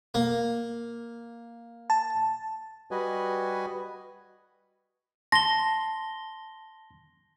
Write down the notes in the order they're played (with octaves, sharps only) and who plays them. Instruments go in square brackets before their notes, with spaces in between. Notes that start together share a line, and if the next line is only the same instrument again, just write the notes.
[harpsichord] A#3
[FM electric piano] A5
[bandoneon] G3 F#4 B4 D#5 G#5
[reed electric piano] A5 C6 [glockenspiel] A#6 G7